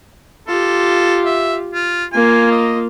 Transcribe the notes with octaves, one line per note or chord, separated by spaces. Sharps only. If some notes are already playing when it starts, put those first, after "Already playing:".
F4 G4 A4
E5
F4
A#3 F4 G#5
D#5